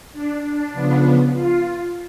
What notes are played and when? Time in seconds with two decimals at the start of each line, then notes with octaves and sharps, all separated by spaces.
0.13 D4
0.43 D4
0.72 C#3 F3 B3
1.31 F4